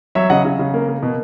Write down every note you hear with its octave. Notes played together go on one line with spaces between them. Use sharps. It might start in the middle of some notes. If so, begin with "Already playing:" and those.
F#3 C#5 E5
C#3 D#5 F#5
C#3
C#3
A#3
A#3
B2